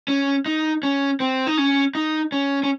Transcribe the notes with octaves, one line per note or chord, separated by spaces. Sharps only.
C#4
D#4
C#4
C4
D#4
C#4
D#4
C#4
C#4